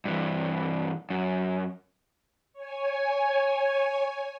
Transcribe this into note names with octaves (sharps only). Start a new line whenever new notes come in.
G2 E3
F#2
C#5 G#5